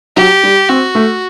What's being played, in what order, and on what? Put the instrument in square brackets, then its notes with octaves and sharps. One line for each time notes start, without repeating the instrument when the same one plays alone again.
[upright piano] F#3 [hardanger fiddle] G4
[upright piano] G3
[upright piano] C4 [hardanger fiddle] F#4
[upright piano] A3